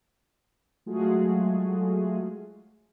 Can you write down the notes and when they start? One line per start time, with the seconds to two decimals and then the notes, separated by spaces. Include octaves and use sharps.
0.86 F#3 G#3 A3 F4 F#4 G#4